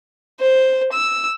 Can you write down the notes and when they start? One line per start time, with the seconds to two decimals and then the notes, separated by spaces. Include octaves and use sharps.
0.40 C5
0.92 E6